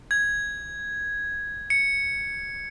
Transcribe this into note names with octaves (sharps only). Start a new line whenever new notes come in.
G#6
C#7